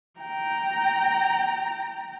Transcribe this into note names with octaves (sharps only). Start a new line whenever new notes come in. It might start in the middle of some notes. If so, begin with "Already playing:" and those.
G5 A#5